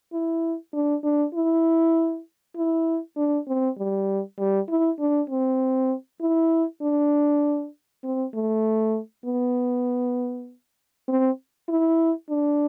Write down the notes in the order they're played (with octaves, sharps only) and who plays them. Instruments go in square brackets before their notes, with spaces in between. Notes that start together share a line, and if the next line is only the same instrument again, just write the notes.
[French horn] E4
D4
D4
E4
E4
D4
C4
G3
G3
E4
D4
C4
E4
D4
C4
A3
B3
C4
E4
D4